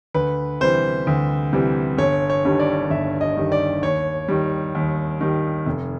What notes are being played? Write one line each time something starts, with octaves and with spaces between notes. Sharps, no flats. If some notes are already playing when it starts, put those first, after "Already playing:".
D2 B4
C3 E3 G3 C5
D2
C3 E3 G3
G1 C#5
C#5
G2 D#3 G3
D5
G1 E5
D#5
G2 D#3 G3
D5
D#2 C#5
D#3 G3
D#2
D#3 G3
F1